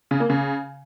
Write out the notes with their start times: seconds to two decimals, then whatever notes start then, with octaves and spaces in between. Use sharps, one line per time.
0.11 C#3
0.20 A#3
0.30 C#3